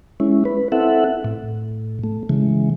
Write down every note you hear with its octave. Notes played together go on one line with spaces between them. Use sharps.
G#3 C#4 E4
B4
C4 E4 A4 E5 F#5
A2
A3
C#3 E3 G#3